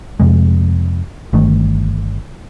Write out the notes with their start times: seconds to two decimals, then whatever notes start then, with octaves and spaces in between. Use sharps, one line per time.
0.20 F2 C3 G#3
1.33 G1 G2 D#3 A3